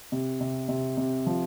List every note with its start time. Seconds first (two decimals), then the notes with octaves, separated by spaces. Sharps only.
0.12 C3
0.40 C3
0.69 C3
0.97 C3
1.26 F3